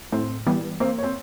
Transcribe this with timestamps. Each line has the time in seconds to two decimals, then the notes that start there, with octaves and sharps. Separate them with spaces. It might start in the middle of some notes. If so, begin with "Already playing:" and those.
0.12 A2 C4 C5
0.47 E3 G3 B3
0.80 A#3 C4 C5
0.98 C#5
1.03 C4 C5